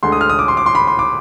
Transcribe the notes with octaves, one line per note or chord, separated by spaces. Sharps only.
D2 D3 G#3 C6
D#6
F6
D#6
D6
C6
D6
C6
B5
C6
D6